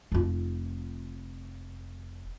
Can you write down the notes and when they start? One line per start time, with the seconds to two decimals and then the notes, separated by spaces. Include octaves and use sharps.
0.12 F1 F4